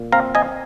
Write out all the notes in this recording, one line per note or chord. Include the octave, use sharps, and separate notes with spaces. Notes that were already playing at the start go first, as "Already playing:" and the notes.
Already playing: A#2
C4 F5 A#5
D#5 G#5